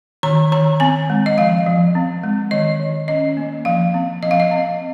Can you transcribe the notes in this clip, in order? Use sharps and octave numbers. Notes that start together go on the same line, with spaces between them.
D#3 A#5
D#3 A#5
C4 G#5
G#3
D#5
F3 F5
F3
C4
G#3
D#3 D#5
D#3
C#4 D#5
A#3
F3 F5
C4
F3 D#5
F5
D#5
C4